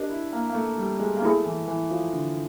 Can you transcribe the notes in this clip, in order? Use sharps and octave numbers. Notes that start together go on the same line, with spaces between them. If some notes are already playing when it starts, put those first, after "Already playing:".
Already playing: D4 G4 A#4 D#5
E4
A#3
A#3
A3
G3
G#3
A#3
A3 B3 E4 G#4
E3
E3
F3
D3